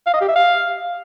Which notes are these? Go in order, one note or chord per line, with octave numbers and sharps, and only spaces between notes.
F5
D#5
G4
E5
F5